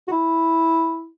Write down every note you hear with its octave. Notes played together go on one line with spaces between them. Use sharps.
F#4
E4